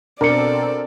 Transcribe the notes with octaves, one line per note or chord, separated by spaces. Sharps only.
B2 C4 D4 A4 A#4 D5 D6 C#7